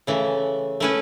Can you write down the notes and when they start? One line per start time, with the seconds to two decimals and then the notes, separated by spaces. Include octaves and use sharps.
0.07 C#3 E3 A3
0.80 A3 C#4 E4 B4